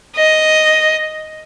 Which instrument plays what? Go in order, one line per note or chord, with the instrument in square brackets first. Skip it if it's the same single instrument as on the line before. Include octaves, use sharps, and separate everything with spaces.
[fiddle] D#5